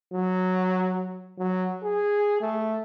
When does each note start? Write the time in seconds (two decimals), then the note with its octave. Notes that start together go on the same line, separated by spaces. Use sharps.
0.14 F#3
1.38 F#3
1.83 G#4
2.41 A3